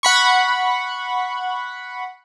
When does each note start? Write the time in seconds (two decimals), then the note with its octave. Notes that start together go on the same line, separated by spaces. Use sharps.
0.03 F#5 B5 C#6